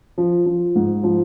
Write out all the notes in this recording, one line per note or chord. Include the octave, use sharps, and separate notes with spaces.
F3
F3
G#2
F3